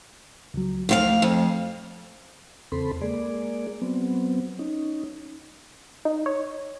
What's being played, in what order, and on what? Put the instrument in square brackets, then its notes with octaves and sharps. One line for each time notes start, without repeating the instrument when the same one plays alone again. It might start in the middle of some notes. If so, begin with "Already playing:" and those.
[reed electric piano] C#2 F#3
[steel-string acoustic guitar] F2 F4 F5 [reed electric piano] A3
[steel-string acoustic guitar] F2
[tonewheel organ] E2 C#3 C4 A4 B5 C6
G#3 A#3 G#4 D5
F#3 B3 C4
C#4 D#4
[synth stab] D#4
C#5